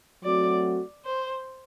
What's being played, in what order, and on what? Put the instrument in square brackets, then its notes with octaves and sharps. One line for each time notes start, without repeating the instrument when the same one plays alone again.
[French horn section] F#3 A3 C4 F#4 [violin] D5
[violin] C5